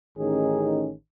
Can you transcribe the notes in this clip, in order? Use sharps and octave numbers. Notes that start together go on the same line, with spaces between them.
A1 D#3 C#4 D#4 G#4